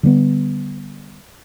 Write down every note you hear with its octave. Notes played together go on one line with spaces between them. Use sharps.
D3 G3 A#3 B3